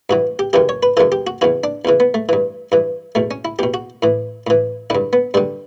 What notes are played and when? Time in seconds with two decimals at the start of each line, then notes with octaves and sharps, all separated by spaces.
0.10 G2 E3 F#4
0.39 G4
0.53 F#2 C#3 E3 G4
0.69 C#5
0.83 B4
0.97 F#2 C#3 E3 A4
1.12 G4
1.27 F#4
1.41 E2 C#3 E3 F#4
1.64 D4
1.85 E2 C#3 E3
2.00 B3
2.14 A3
2.29 G2 E3
2.72 G2 E3
3.15 E2 B2 A3
3.31 C#4
3.45 E4
3.59 E2 B2 G4
3.74 F#4
4.03 A2 E3
4.47 A2 E3
4.90 G2 D3 E4
5.13 B3
5.34 G2 D3 G3